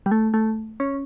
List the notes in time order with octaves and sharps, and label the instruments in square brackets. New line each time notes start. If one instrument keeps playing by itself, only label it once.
[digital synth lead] G3
A3
A3
C#4